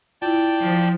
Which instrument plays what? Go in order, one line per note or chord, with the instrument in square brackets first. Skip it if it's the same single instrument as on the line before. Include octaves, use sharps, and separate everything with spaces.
[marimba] E4 F4 [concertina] D5 G5 A5
[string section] F3